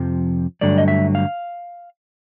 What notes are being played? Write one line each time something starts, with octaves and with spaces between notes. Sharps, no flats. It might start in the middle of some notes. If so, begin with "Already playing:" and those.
Already playing: F2 C3 F3
G2 D3 F#3 A3 D5
D#5
E5
F5